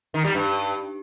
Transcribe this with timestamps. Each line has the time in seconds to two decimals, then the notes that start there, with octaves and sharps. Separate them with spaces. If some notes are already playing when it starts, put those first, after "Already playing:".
0.14 D#3
0.25 G3
0.35 G2